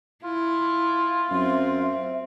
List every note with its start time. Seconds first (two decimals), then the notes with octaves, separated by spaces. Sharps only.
0.24 E4 F4
1.31 F#2 C4 E5